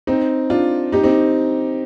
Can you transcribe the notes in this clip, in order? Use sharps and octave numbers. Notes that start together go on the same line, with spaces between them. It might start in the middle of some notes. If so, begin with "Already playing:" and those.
C4 D#4
D4 F4
D#4 G4
C4 D#4